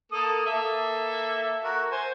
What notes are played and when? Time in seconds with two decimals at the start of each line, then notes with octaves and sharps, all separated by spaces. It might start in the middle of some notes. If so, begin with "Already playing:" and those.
0.12 A#3 A4 D#6
0.46 A#3 A4 E5
1.65 F#4 A#4
1.92 C5 G#5